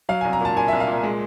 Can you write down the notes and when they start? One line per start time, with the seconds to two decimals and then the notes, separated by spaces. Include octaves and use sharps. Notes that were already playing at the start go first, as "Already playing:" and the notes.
0.09 F#3 F5
0.21 C2 G#5
0.33 A#5
0.40 A#2 A5
0.56 A#2 G#5
0.68 C2 E5
0.80 F5
0.87 A#2
1.03 G#3